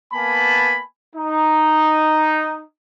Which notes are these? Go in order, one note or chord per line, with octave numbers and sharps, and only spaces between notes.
A#3 B3 G#5 A5 B5
D#4